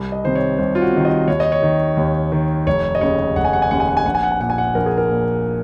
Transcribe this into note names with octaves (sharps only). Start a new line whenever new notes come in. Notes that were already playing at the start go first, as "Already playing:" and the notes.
Already playing: C2
D#5
C3 D#3 C5
C#5
C2 C5
F4
F#4
C3 D#3
D#5
D#2 C#5
D#5
C#5
D#3
D#2
D#3
F1 C#5
D#5
D#2 C#3 C#5
F1 F#5
G#5
F#5
G#5
D#2 C#3 F#5
G#5
F#5
G#5
A#1 F#5
G#5
F#5
G#5
A#2 F#5
G#5
F#5
A#1 A#4
G#4
A#4
A#2